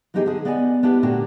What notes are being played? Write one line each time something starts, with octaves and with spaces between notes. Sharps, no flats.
E3 F#3 B3 D#4 G4 G#4
D3 G#4
B3 D5 D#5 F5 G#5
B3 D4 E4 G4 B4
A#2 D3 A3 D4 F#4 G4